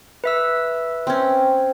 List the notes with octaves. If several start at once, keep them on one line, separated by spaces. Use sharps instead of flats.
B4 E5 E6
C4 C#4